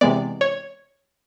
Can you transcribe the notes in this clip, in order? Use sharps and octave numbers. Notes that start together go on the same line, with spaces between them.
C3 E3 G#3 B3 D5
C#5